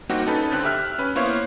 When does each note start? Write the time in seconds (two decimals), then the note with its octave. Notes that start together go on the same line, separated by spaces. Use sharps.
0.09 G3 A#3 C4 D#4 F#4 G4
0.26 C#4 D#4 A4 B4
0.51 D#2 D3 C4 F#6
0.64 G4 E5 F6 F#6
0.99 C#4 B4
1.15 A#3 B3 E4 C5 C#5 F5